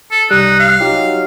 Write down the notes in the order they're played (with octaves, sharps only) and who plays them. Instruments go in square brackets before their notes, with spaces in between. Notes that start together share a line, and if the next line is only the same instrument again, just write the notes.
[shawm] A4
[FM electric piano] C2 G3 [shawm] D#4 [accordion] F#6
[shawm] F5
[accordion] F#3 [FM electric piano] D#4 F4 G4